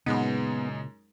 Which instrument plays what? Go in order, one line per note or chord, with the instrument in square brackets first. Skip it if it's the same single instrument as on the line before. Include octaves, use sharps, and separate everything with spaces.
[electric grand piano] F#2 G#3 D#4 [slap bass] A#2 C#3 [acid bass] B3